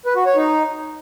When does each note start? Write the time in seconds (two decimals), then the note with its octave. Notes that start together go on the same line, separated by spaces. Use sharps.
0.06 B4
0.16 F#4
0.26 C#5
0.36 D#4